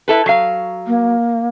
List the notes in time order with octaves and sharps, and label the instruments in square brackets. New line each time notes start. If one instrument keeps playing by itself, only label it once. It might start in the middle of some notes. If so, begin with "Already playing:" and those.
[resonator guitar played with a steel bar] E4 A4 B4
F#3 F5
[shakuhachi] A#3